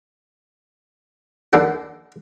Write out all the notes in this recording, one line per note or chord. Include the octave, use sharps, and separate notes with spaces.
D#2 A#3 D4 A4 F#5